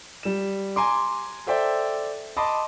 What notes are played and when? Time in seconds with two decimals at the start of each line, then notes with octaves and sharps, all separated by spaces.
0.23 G3 E7
0.76 G#5 A#5 C6 D6
1.47 A4 C5 D5 E5 G5
2.37 D#5 A5 B5 C6 D6 D#6